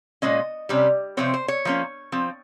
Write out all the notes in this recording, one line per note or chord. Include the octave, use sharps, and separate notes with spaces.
A#2 G#3 C#4 D#5
C3 G3 C#4
C3 F3 C4 C#5
C5
C#5
F3 A#3 C#4
F3 C4